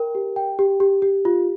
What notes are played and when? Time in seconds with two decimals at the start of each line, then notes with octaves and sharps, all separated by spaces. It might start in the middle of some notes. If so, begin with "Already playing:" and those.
Already playing: A#4 G5
0.15 G4
0.36 G5
0.59 G4
0.80 G4
1.02 G4
1.25 F4